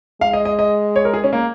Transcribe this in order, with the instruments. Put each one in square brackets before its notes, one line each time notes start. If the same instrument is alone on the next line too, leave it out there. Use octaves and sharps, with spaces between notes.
[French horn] G#3 [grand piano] F5
[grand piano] D#5
D#5
D#5
C#5
A#4
G#4
C#4
A#3